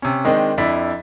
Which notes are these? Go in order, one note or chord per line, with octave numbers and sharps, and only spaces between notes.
C3 C#4
D#3 G#3 C4 D4 D#4
F2 D4 E4 B5 B6